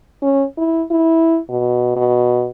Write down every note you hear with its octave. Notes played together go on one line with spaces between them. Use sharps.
C#4
E4
E4
B2
B2